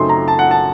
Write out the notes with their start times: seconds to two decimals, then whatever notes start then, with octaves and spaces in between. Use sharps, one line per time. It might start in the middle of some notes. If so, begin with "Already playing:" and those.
Already playing: F#2 C#3 A3 C4 D#4 C6
0.09 A#5
0.28 A5
0.39 F#5
0.51 A5